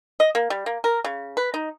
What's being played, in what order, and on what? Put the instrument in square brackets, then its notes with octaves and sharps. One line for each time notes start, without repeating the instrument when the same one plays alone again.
[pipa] D#5
A#3
G3
A#3
A#4
C#3
B4
D#4